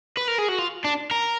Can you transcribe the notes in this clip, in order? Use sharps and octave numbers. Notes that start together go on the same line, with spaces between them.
B4
A#4
G#4
F#4
F4
D4
A#4